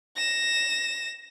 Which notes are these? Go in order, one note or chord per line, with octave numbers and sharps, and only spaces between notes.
A#6 E7